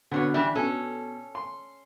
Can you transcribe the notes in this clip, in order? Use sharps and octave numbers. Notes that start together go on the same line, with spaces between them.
B2 D3 B3 C5 C#5
E3 G3 D4 E5
B2 C#4 A4
C6